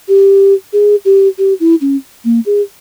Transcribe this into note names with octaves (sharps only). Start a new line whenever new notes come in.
G4
G#4
G4
G4
E4
C#4
A#3
G#4